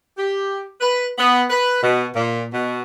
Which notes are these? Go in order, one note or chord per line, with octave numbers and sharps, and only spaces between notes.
G4
B4
B3
B4
B2
A#2
B2